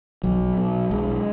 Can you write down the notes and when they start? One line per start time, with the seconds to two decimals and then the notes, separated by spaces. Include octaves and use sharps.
0.23 B1 F#3
0.57 B2
0.90 B1 G#3